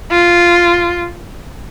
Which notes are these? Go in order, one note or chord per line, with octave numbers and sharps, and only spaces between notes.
F4